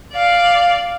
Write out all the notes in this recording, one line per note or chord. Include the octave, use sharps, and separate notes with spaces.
D5 F5